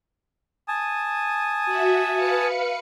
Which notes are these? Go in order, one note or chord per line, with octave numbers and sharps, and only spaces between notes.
G#5 A5 D#6
F#4 E5
B4 F5 C#7